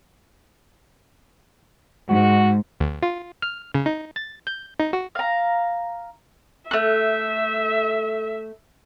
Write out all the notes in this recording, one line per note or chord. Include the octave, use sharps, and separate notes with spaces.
G#2 F#4
D2
F4
F6
C#3
D#4
A6
G6
D#4
F#4
F5 A#5
A3 E5 F#6